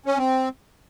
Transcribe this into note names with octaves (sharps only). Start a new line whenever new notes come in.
C#4
C4